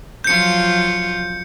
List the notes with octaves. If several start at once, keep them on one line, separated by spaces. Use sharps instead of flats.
F3 F#3 F4 G6 C#7